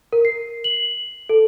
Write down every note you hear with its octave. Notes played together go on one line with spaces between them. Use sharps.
A#4
C7
F#7
A4